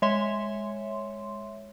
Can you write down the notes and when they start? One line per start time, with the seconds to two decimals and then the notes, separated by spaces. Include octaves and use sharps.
0.02 G#3 C#5 E5 C6